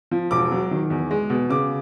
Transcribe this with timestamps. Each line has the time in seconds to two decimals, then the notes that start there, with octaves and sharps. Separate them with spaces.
0.11 F3
0.31 E1 D6
0.51 F#3
0.71 D#3
0.90 E2
1.11 G#3
1.30 B2
1.50 C#3 D6